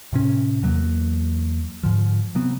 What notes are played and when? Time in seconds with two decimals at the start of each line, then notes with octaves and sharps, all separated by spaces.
0.13 A2 C3 C#4
0.63 E2 F#3 A#3
1.83 G#2 D3 F3
2.35 C3 F#3 B3 C4